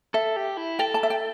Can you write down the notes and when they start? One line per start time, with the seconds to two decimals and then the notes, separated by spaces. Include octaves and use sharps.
0.14 A4 E5
0.36 G4
0.57 E4
0.79 A4 G5
0.94 A5
1.03 E5
1.10 G5